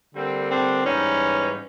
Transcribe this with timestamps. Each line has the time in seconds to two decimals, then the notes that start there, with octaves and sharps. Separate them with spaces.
0.14 D3 G3 A#3 C4
0.50 C4 D4
0.85 G#2 E3 G3 B3 C#4 D#4